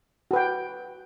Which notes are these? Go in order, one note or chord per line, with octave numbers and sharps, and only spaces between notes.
F#4 B4 G5